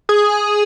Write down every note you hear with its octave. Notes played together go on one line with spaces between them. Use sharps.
G#4